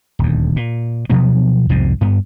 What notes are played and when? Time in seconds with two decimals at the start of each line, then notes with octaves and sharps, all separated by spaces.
0.19 D#1 D2
0.56 A#2
1.10 B2 F3 F#3 B3
1.69 C2 F2 G#2 C3
2.01 G2 B3